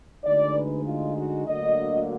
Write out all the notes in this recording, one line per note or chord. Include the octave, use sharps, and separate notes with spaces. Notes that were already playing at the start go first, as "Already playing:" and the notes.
D2 D3 G#3 D#4 D5
B4
F4
F#4
D2 D3 F#3 A#3 D#5